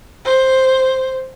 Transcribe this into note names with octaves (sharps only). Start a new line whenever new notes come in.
C5